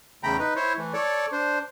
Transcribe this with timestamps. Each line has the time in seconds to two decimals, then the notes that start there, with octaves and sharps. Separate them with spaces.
0.23 E2 C#3 A3 G5 A#5 B5
0.39 D#4 B4
0.56 E4 C5 C#5
0.78 E3 A3
0.93 A4 C#5 D5
1.32 D4 C5